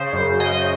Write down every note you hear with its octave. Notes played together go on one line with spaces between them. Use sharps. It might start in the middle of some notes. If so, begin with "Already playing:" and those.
Already playing: C#3 C5
F#2
C#3 D#5